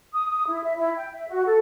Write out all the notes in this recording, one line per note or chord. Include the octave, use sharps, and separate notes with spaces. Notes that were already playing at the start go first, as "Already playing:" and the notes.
D#6
D#6
E4
E5
E4
G5
E5
F#4
A4